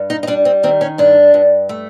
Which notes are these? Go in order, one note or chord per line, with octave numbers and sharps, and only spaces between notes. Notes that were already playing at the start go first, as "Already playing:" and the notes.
Already playing: G2
D#4
D#4
G3 D4
C4
D#3 C4
C#4
G2 D4
G2
A3